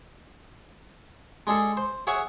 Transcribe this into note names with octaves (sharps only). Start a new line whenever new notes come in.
G#3 D4 G#4 A4
C5
G#4 C#5 E5 F#5 G#5